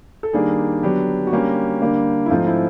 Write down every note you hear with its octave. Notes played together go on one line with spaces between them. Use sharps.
A4
D#3 G3 A#3 D4 G#4
D3 F#3 B3 D4 G4
F#4
D3 G3 A#3 C#4 G4
D3 G3 A#3 D4
E4
G#2 F3 A3 C4 D#4 F4
E4